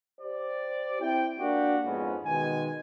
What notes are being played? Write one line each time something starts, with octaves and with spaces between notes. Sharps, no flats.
G4 C5 D5
C4 E4 G5
A#3 D4 F#4 G4
F2 G#2 B3 C#4
B2 D#3 G#3 G#5